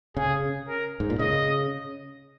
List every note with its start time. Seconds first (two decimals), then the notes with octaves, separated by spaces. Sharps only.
0.17 C#3 G#4
0.68 A#4
1.00 G#2
1.10 A#2
1.19 C#3 D#5